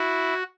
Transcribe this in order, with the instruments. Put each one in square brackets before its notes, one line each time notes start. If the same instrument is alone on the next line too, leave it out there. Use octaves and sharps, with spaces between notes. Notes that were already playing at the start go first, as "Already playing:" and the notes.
Already playing: [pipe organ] E4 F#4